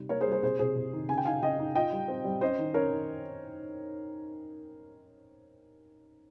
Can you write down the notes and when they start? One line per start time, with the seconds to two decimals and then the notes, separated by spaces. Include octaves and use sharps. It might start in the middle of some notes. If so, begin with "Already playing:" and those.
Already playing: C3 G3 D#4
0.09 A#3 A#4 C#5
0.21 G#4 C5
0.26 G3
0.31 G#4 C5
0.43 C3 G#4 C5
0.59 C3 G#4 C5
0.76 C3
0.93 D#3
1.09 C#3 G#5
1.18 G5
1.25 D#4 F5 G#5
1.42 C#3 D#5 G5
1.59 D#4
1.75 F4 D#5 G5
1.92 G3
2.08 C4
2.25 G3
2.41 C#4 C5 D#5
2.58 D#3
2.74 C#4 A#4 C#5
2.91 D#3